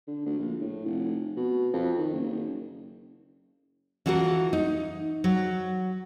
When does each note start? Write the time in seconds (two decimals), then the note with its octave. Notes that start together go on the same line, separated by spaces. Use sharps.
0.07 D3
0.26 D2
0.39 A#1
0.61 A2
0.85 F1
1.37 B2
1.73 F2
1.99 D#3
2.13 F#1
4.06 E3 F4 F#4 A4 A#4
4.53 D#4
5.24 F#3